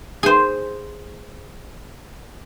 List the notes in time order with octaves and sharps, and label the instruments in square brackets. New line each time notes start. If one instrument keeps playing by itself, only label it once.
[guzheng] G#4 C5